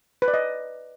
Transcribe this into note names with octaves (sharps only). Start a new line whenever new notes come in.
B4
D5
D#5